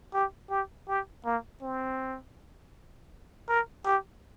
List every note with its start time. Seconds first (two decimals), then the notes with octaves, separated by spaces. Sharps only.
0.14 G4
0.50 G4
0.89 G4
1.26 A#3
1.62 C4
3.49 A#4
3.86 G4